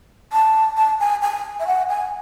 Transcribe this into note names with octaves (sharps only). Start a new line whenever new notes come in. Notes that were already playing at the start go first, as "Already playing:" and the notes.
A5
A5
G#5
G#5
E5
F#5
G#5